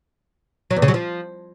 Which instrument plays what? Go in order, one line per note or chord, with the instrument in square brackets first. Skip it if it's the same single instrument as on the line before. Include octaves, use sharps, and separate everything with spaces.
[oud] F#3
E2
C#3
F#3
F3